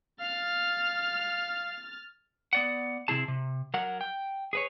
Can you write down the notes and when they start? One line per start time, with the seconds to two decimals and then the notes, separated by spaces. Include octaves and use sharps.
0.20 F5 F6 A6
2.53 B3 D5 F#5
3.08 C3 C4 E4 G#4 A5
3.28 C3
3.74 F#3 A#4 F#5
4.01 G5
4.53 G#4 B4 C#5